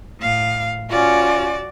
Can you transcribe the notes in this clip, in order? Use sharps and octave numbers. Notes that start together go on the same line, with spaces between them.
A2 F5
C#4 F4 F#4 D5